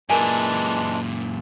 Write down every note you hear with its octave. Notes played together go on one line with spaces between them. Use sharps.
F#2 A#2 E3 G#3 D4 A#4 G#5